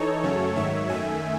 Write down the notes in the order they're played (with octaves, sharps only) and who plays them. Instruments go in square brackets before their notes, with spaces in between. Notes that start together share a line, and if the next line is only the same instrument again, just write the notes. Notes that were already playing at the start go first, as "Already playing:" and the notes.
Already playing: [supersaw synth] E3 D#4 A4 C#5
F#2 C#3 F#3 A3 C#4
G#2 D#3 F#3 C#5 E5
F#2 D#3 A3 E5 G#5